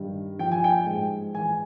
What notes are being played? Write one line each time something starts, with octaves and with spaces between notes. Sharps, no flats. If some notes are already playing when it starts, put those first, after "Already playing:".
Already playing: G2 D#3
F3 G5
G#5
G5
G#2
E3 G#5